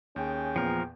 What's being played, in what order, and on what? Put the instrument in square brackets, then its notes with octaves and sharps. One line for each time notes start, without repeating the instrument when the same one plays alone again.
[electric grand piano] D#2 [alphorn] C#4 [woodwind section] G#4 G5
[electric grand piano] E2 A#2 B3 [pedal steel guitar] F3 A#4